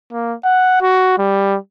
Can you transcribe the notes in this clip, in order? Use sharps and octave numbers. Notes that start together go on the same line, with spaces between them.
A#3
F#5
F#4
G3